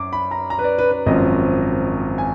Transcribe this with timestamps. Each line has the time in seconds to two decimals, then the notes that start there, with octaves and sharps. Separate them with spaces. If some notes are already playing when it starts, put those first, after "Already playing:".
Already playing: F#2 D6
0.13 B5
0.31 A#5
0.50 A#5
0.59 B4
0.64 D5
0.79 B4
0.91 B4
1.06 G#1 F#2 F3 D#5
2.18 G#5